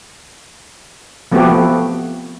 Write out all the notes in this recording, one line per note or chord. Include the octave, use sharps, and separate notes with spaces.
F3 A3 B3 C4 F#4 G4